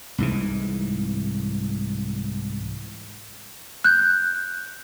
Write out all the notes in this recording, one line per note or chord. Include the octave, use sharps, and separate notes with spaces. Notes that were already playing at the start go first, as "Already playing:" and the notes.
C2 G#2 E3
F#6 G6